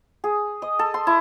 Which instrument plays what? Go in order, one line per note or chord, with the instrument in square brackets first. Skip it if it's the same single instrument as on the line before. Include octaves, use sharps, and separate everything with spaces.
[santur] G#4
D#5
A4
C6
E4